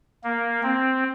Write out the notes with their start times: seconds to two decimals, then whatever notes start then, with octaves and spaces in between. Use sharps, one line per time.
0.24 A#3
0.63 C4